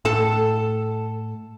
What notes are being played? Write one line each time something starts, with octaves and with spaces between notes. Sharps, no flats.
A2 A4 A5